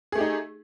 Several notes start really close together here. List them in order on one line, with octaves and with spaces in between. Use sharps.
G#4 A3 G4 D#4